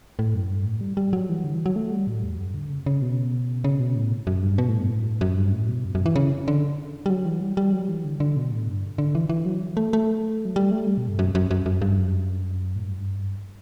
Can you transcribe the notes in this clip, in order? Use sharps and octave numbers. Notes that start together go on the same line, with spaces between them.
A2
F#2
G2
A2
G3
G3
F#3
E3
D3
E3
F#3
A3
G3
A2
E2
F#2
D3
C#3
C#3
B2
C#3
B2
A2
F#2
G2
B2
A2
G2
A2
F#2
G2
A2
B2
F#2
F#2
E3
C#3
D3
G3
F#3
E3
G3
G3
F#3
E3
D3
D3
B2
A2
G2
D3
E3
E3
F#3
A3
A3
F#3
G3
A3
G3
B2
G2
F#2
F#2
F#2
F#2
G2
F#2
A2
G2
F#2
G2